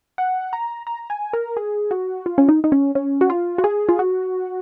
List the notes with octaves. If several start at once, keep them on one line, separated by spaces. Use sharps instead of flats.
F#5
A#5
A#5
G#5
A#4
G#4
F#4
F4
C#4
D#4
D#4
C#4
C#4
F#4
F4
F#4
G#4
F4
F#4